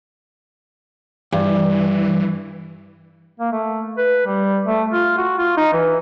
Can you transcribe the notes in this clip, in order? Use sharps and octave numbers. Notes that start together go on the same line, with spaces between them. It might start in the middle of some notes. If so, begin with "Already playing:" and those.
G2 E3
A#3
A3
B4
G3
A3
F4
F#4
F4
D#4
E3